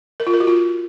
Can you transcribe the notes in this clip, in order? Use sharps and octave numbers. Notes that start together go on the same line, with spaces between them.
A#4
F4
A#4
F#4
F4